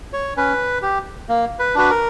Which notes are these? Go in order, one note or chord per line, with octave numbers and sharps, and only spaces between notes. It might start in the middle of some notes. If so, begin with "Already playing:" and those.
C#5
C#4 B4
G4
A#3
B4
D4 F#4 B4
A#4